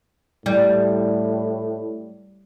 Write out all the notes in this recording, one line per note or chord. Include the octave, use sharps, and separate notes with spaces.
A2 G3